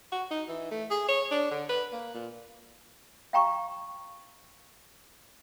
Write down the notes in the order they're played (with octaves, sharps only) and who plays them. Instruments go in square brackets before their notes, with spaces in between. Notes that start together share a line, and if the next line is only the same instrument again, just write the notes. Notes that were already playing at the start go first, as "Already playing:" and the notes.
[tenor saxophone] F#4
D#4
E3
A3
G#4
C#5
D4
D3
B4
A#3
A#2
[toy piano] F5 G5 A#5 C#6